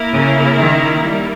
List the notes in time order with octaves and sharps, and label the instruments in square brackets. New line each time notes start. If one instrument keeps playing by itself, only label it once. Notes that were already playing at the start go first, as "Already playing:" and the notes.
Already playing: [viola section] A#3 E4 A#4
[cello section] C#3
D#3
G3